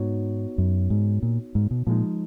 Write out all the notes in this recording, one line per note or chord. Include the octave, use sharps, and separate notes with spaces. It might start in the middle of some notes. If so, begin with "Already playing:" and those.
Already playing: G#2 B3 D#4 F#4 C#5
F#2
G#2
A#2
G#2
B2
A#2 F3 G#3 D#4